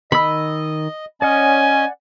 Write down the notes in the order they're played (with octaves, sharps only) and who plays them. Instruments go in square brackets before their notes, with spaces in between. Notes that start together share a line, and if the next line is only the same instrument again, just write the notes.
[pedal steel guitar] D#3 E6 [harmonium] D#5 [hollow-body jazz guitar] B5
[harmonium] C#4 D#5 [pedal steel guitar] D5 F#5 F6 [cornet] G#5